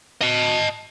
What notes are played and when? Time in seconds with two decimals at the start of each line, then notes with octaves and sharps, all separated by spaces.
0.21 D#5 A5